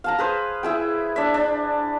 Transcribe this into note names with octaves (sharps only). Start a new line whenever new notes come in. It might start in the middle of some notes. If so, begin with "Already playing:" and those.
F5 A5 A#5
G#4 B4 C5
E4 G#4 G5
D4 E5
D4